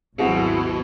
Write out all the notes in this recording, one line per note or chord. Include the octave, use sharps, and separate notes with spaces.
G#1 D#2 B2 F#3 C4 E4 F#4 G#4